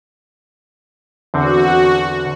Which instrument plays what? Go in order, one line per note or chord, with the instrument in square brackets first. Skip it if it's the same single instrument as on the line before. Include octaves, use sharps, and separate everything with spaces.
[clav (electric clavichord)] E2 D3 C4 [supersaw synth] F#4